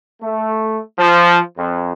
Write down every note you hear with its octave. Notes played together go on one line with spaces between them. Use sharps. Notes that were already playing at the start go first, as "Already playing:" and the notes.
A3
F3
F2